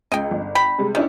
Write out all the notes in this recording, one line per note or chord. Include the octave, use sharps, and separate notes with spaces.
C#2 D#5 G5
G1
G5 B5
C3 G3 G#3
D#3 C#4 D4 E4